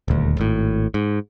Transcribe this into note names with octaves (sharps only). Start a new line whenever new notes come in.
D#1 D2
G#1 A2
G#2